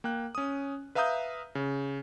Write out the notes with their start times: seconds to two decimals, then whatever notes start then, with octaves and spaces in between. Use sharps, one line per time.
0.04 A#3 G5 F#6
0.35 C#4 D#6
0.95 B4 E5 F5 A#5 D#6 G6
1.55 C#3